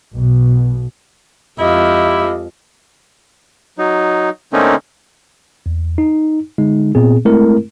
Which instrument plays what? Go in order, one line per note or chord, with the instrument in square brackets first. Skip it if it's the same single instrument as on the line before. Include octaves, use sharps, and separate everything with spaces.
[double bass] B1 B2
[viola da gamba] F2 G#3 [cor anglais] E4 [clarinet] G4 [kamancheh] D#5 F5
[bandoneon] F#3 D#4
D3 A3 A#3 C4 C#4 D#4
[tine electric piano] E2
D#4
D3 G#3 D#4
A#2 B3 C4 G#4
G#3 A3 C4 E4 A#4